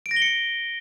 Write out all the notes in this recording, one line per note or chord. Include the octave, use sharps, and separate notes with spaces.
D7
A#6
G7
C#7